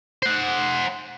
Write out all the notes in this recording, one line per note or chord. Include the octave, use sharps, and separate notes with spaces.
C5 F#5